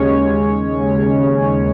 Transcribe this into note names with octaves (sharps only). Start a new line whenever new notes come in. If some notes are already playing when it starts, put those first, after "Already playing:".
Already playing: D#2 C#3 G#3 C#4 C#5